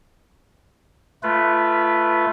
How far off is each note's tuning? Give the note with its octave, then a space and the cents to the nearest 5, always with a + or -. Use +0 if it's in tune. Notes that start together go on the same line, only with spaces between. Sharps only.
A3 +0 F4 -20 B4 +0